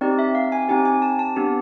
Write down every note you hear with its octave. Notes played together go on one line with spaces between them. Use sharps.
C4 D#4 G4 D5
E5
F5
G#5
C4 D#4 G4 G#5
G#5
A5
A5
B3 D4 G4